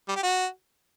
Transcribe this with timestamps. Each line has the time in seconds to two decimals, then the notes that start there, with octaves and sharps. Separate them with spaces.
0.09 G3
0.16 G4
0.23 F#4